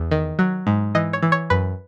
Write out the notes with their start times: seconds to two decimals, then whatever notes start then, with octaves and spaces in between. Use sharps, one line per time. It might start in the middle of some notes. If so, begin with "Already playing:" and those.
Already playing: E2
0.11 D#3
0.39 F#3
0.67 G#2
0.95 E3 D#5
1.13 C#5
1.22 E3
1.32 C#5
1.50 F#2 B4